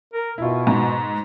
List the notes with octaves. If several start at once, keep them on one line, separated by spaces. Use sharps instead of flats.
A#4
B2 E4 F4
G#2